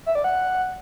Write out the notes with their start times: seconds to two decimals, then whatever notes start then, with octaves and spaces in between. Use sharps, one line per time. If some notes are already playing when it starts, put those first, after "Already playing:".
0.06 E5
0.15 D5
0.24 F#5